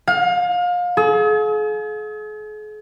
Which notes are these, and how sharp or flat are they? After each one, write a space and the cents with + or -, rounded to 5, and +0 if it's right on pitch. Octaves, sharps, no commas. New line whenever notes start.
F5 +30
G#4 +45